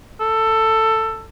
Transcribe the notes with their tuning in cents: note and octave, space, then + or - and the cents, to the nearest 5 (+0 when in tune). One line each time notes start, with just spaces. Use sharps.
A4 +15